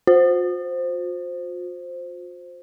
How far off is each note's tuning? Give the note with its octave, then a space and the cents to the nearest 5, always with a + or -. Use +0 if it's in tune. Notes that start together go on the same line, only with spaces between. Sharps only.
F4 +45 C5 +0